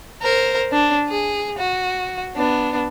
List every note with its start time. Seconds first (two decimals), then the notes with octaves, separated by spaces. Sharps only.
0.22 A#4 C5
0.72 D4
1.08 G#4
1.58 F#4
2.36 B3 D4